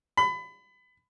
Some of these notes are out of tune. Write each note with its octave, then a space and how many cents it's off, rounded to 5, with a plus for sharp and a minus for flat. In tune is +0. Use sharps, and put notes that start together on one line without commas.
B5 +25